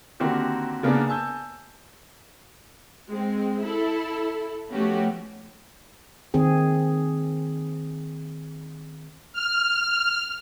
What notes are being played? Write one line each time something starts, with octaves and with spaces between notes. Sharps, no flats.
D3 D#3 A#3 C4 F#4 G4
C#3 A#3 B3 D4 G#4
G#5 A5 E6 G6
G#3 C4
E4 A4
F3 A3 B3 C#4 F#4 G4
D#3 C4 G#4
F6